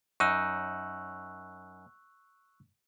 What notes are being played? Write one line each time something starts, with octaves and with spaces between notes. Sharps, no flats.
F#2 D#4 C#6 E6 F#6